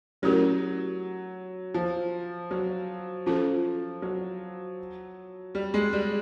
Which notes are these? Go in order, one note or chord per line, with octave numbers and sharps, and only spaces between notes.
F#3 A3 C#4 E4 G4 A#4
F3
F#3
F3 C#4 F4 A4
F#3
G3
G#3
G3